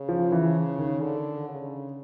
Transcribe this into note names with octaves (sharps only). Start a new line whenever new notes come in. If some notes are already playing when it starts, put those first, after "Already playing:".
Already playing: C#3
F3
E3
D#3
D3
C#3